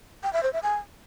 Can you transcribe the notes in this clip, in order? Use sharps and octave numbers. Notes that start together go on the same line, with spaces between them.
G5
E5
C5
E5
G#5